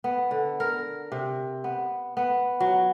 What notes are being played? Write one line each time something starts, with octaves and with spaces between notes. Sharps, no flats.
B3
D3
A#4
C3
B3
B3
F#3